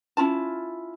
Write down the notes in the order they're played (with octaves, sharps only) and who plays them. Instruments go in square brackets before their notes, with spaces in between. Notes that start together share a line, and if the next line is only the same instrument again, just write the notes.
[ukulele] C#4 E4 F4 A5